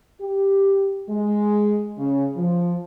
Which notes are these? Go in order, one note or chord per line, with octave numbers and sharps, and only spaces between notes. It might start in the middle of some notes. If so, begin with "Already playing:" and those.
G4
G#3
C#3
F3